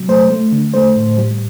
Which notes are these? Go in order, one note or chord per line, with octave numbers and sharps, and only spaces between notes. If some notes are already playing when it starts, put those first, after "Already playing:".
Already playing: C3 F#3
A3 C5
A3
D3
A3 C5
A2
G3